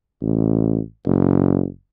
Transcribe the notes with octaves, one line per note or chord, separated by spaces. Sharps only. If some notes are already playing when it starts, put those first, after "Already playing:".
A1
F#1